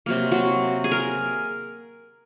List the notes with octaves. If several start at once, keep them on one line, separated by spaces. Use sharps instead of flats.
C3 F#3 A#3
F#3 F#4
G#4
A#4